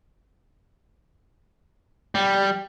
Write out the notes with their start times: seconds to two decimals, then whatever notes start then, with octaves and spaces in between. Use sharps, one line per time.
2.15 G3